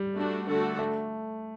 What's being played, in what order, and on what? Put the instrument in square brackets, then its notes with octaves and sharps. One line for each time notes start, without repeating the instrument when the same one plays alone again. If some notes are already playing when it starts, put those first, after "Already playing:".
Already playing: [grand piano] G3
[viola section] A3 D4 F#4
D3 A3 D4 F#4 A4
[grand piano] A3